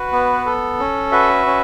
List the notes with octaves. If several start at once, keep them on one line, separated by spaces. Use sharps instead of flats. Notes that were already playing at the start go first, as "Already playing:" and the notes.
Already playing: F#4 B4
B3
A4
C#4
F#4 B4 E5
C#4